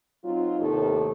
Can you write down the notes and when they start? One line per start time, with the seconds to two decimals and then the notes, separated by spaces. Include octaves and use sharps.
0.23 F#3 C4 D#4 F4
0.59 D#2 A2 C3 D#3 G4 A4